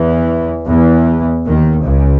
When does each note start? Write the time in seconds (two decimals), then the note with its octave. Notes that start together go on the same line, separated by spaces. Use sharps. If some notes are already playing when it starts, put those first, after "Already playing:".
Already playing: E2 E3
0.67 E2 E3
1.47 D#2 D#3
1.85 C#2 C#3